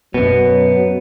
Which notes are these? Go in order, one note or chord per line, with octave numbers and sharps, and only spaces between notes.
F#2 B2 F#3 B3